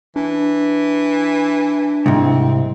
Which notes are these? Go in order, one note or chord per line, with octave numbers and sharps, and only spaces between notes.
E3 D4
C2 G#2 C4